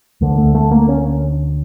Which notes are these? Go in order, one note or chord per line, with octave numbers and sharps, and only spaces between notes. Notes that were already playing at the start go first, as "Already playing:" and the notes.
D2 D3 A3
A3
A3
A#3
C#4